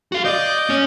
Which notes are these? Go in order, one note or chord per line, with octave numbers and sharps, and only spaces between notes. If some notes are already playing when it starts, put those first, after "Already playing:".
F#4 F5
D5 D#5 G6
C#4 C#5